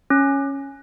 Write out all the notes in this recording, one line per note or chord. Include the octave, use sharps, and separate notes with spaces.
C#4